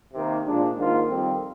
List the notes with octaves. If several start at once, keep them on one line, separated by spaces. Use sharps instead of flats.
C3 D#3 A#3
A#2 F3 G#3 D4
G#2 D#3 A#3 F4
F2 D#3 G3 C4